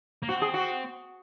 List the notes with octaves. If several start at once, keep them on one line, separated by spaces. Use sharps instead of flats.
A#3
C4 F#4
G#4
F#4